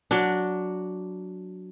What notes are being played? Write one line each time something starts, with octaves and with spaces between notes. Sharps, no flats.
F#3 D4